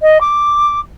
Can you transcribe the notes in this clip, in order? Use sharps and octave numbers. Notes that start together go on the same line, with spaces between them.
D#5
D6